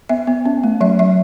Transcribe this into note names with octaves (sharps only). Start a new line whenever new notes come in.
B3 E5
B3
C#4
A3
F#3 E5
F#3 E5